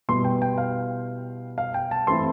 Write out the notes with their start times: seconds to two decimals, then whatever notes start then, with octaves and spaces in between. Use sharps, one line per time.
0.08 B2 G3 B3 E4 C6
0.25 G5
0.42 G5
0.58 F5
1.58 F5
1.74 G5
1.91 A5
2.07 E3 A3 C4 E4 C6